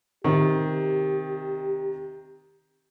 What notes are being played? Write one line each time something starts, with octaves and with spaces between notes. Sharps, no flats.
C3 D#3 G4